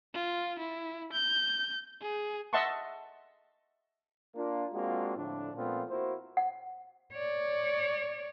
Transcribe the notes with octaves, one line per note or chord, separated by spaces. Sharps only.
F4
E4
G6
G#4
D#5 E5 F#5 A5 C6 C#6
A#3 D4 F4
G#3 A#3 C4 D4 F4 F#4
A2 D3 F3 D4
A#2 F3 A3 B3 C4 F4
A#3 E4 F#4 A#4 C5
F#5
C#5 D5